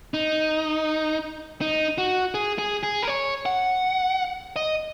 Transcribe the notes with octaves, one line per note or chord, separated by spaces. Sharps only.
D#4
D#4
F#4
G#4
G#4
G#4
A#4
C#5
F#5
D#5